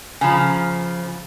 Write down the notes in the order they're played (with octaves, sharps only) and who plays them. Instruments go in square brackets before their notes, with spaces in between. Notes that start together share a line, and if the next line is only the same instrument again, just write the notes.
[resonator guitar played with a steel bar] C#3 F3 [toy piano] G#5 A#5 B5